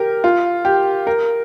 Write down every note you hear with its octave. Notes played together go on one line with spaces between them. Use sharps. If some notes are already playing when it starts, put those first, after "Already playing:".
Already playing: G4 A#4
F4
G4
A#4